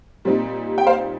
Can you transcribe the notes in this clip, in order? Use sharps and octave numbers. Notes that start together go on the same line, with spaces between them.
A#2 G3 C4 D#4
G5
C5 F5